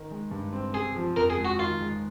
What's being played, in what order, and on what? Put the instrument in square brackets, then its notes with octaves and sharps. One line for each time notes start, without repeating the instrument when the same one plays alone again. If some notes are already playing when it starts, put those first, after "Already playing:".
Already playing: [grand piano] D#3
G#3
G2
C4
[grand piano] C3 [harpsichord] G#4
[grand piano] F3
[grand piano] F2 [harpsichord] A#4
[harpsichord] G#4
[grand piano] G#3
[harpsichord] F#4
[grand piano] D#3 [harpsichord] F4
[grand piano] G#3